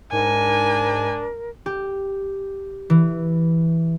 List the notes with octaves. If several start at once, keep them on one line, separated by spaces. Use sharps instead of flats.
G#2 D4 A#4 G#5
G4
E3